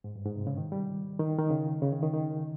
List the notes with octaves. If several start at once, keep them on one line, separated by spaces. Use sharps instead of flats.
G#2
G2
G#2
C3
C#3
D#3
G3
D#3
D#3
C#3
C#3
D#3
D#3
D#3